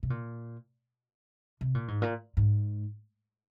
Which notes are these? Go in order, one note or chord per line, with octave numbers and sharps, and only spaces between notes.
C3
A#2
C3
A#2
G#2
A#2
G#2